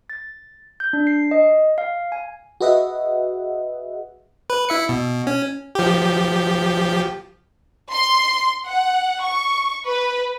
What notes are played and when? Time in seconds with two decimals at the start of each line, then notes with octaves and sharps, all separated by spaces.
0.10 A6
0.80 G6
0.93 D4
1.07 C7
1.31 D#5
1.78 F5
2.12 G#5
2.61 F#4 G#4 B4 D#5 E5 F#5
4.50 B4
4.69 E4 E5 C#7
4.89 B2
5.27 C#4
5.75 F3 G4
7.91 C6
8.66 F#5
9.22 C#6
9.85 B4